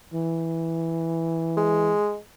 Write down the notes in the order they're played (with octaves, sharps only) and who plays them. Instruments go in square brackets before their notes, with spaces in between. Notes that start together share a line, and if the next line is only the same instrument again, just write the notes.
[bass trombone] E3
[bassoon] G#3